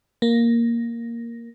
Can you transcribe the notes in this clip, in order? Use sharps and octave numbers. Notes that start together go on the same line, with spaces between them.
A#3